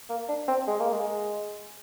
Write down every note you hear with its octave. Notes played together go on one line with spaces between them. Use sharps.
A#3
D4
C4
G#3
A#3
G#3